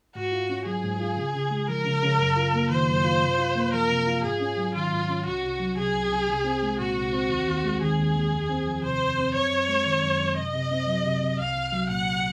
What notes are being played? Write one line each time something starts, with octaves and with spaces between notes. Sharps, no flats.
G#2 F#4
F4
C#4
F#3 G#4
G#2
F4
C#3
C#3
G#3
F3 A#4
C#3
C#3
F#2
F4
A#3
D#3 C5
F#2
F4
C3
F4
A#3
F3 A#4
C3
F4
G#2 G#4
C#4
F#3
D#3 F4
G#2
C#4
C2 F#4
C2
F#3
C3 G#4
C2
C2
C2
C4
G#3
A#2 F#4
C2
C4
D#2
D#2
G#3
D#3 G#4
D#2
D#2
F2
C4
F3
C3 C5
F2
C4
F#2 C#5
F#2
G#3
D#3
F#2
F#2
C3 D#5
C3
C4
F#3
C3
C3
C2 F5
C2
F#3
A#2 F#5